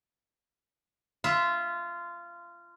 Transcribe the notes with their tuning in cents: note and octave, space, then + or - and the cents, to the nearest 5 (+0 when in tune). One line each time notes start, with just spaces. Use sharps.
F4 -20 E5 +0